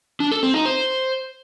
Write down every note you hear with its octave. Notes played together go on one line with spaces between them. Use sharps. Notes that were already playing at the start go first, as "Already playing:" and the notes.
D4
A4
C4
D#4
C5